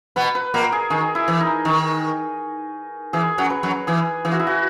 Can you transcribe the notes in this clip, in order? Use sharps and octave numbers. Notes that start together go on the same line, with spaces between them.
B2 B3 B4
B4
A#2 A#3 A#4
G#4
D#3 G#4
E4
E3
D#4
D#3
E3 G#4
F#2 F#3
B4
F#2 F#3
E3 G#4
E3 G#4
F#4
E4
F#4